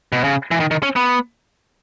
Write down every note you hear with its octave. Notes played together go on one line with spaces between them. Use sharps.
B2
C#3
E3
D#3
D#3
C#4
B3